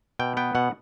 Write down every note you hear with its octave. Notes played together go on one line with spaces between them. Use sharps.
B2 G5
B3 G5
B2 F#5